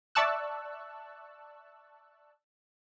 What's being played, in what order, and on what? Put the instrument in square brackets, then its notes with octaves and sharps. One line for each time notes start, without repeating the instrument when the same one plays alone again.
[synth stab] D5 E5 A5 C#6 E6 F#6